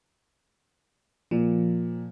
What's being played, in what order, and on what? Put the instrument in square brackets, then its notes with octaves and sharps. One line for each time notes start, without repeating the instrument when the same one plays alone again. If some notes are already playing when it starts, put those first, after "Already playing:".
[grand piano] A#2 [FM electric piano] F3